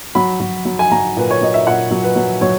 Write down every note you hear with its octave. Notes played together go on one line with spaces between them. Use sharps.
F#3 B5
F#3
F#3
G#5
F#3 A#5
A#2 B4
C#5
F#3 D#5
E5
A#2 F#5
F#3
B4
F#3
F#3 C#5